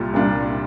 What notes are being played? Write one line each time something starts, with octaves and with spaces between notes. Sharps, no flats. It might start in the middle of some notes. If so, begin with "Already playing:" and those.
Already playing: C2 A#2 G3 F4
C2 A#2 G3 D4 F4